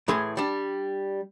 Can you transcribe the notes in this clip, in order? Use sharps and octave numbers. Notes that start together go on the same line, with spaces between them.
A2 E3 G#4 C6
G3 D4